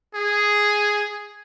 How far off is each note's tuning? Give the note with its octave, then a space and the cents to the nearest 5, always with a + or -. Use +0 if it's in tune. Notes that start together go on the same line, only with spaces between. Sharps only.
G#4 +0